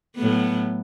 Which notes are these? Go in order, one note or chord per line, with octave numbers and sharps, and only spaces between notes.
A2 F#3 B3